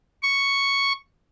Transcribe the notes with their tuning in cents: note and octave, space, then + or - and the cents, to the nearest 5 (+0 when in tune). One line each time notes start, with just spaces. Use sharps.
C#6 +0